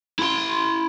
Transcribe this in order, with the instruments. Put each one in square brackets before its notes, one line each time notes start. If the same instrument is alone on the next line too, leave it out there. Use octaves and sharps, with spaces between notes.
[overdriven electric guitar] E4 C6